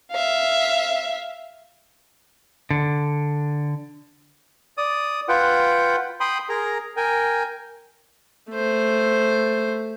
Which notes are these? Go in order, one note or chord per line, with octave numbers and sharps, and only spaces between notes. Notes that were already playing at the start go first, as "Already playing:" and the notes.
E5 F5
D3
D5 D#6
F4 B4 F#5 G5
G5 B5 C6 D#6
G#4 A#4 A#5
A#4 G5 G#5
A3 C5